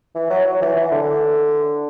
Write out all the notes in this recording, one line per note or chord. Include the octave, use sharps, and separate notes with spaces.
E3
F#3
F#3
E3
E3
D3